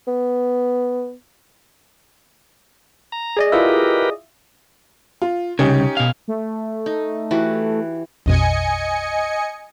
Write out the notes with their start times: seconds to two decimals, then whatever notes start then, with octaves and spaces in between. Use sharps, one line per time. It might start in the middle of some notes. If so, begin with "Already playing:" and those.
0.08 B3
3.12 A#5
3.37 G#4 D5 D#5
3.52 E4 F4 G4 A#4 B4 E5
5.22 F4
5.59 C2 C#3 C#4 D#4 G4
5.97 B2 F5
6.28 A3
6.86 D#4
7.31 E3 F#4 G4
8.26 A#1 F2 B2 D#5 G#5 C#7